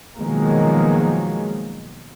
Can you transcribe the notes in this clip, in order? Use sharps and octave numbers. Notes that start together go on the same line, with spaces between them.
B2 D#3 F3 F#3 G#3 A#3